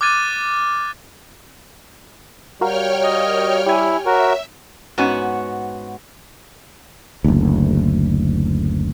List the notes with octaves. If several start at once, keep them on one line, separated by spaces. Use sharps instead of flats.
D6 F6 F#6 G#6 A6 D#7
G3 F#4 A#4 C#5 F5 G5 F6
D#5
E4 G4 G#5
F#4 A#4 C#5 E5
G#2 B3 C#4 F#4
F#1 D2